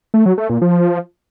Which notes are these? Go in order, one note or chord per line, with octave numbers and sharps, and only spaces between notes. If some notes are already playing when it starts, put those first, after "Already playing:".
A3
F#3
A3
A#2
F3